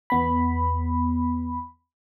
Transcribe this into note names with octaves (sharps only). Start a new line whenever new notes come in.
E2 B3 B5